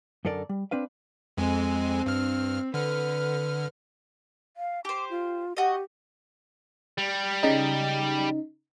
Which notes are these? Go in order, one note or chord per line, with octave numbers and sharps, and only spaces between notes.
F#2 D3 A4 A#4 D5
G3
C4 D4 B4 F5
F2 G#3 C4 G#5
G2 F6
D3 B4 F6
F5
G4 C5 D6
F4
F#4 G4 D#5
G3
C#3 D#4